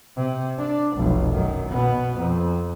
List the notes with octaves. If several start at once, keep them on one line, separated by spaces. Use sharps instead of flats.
C3
D4
F1 B1
F#2 D#3
B2 B3
F2